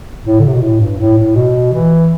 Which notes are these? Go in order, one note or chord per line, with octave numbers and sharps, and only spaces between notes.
A2
D3
C3
B2
A2
G2
A2
A2
B2
E3